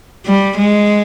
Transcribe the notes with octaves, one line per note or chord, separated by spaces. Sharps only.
G3
G#3